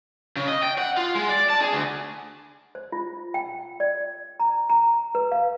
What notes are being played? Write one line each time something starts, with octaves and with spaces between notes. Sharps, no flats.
C#3
D#5
G5
F#5
F4
G#3
D5
A5
G#4
D2
C5
F4
G5
D5
A#5
A#5
B4
F5